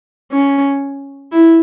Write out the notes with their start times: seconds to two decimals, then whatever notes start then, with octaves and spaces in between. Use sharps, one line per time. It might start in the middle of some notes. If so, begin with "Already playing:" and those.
0.32 C#4
1.32 E4